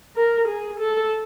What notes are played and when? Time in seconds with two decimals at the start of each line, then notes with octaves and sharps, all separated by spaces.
0.16 A#4
0.48 G#4
0.80 A4